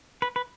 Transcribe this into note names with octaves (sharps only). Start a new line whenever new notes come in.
B4
B4